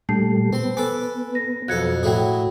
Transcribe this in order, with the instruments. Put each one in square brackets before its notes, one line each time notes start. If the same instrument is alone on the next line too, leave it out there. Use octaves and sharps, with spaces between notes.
[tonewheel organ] A#2 G3 A3 [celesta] D4 A5 C7
[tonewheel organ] B3 [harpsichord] C4 C6
[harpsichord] A4 B4 D6 [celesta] G#5
[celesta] A#6
[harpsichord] B1 F2 A4 [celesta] F#6 G#6 C#7
[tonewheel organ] A2 [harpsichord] F#3 E4 G#4 [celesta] A4 C#5 G5